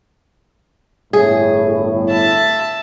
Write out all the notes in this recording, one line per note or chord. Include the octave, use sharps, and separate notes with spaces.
G1 A2 G#4
E5 A5